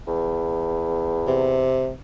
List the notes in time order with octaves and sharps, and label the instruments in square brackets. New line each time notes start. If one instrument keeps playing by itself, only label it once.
[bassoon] E2
[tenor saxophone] C3